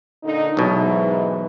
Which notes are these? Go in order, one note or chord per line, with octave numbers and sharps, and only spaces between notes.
A#2 D3 D#4
B1 G#2 B2 E3